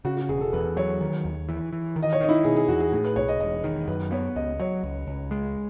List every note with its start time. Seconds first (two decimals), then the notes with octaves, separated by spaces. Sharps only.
0.05 C#3 F#4
0.17 F#4
0.29 E1 G#4
0.41 A4
0.53 E2 B4
0.77 F#3 C#5
1.01 D#3
1.25 D#2
1.49 E3
1.73 E3
1.96 D#3
2.02 D#5
2.13 C#5
2.20 D#3 D#4
2.29 E4
2.44 B2 G#4
2.56 G#4
2.68 E2 F#4
2.80 G#4
2.92 A2 G#4
3.04 B4
3.16 B1 C#5
3.28 D#5
3.40 E1 D#5
3.64 D#3
3.88 F#2 B4
4.12 B3 C#5
4.36 C#2 D#5
4.60 F#3 C#5
4.83 C#2
5.07 C#2
5.31 G#3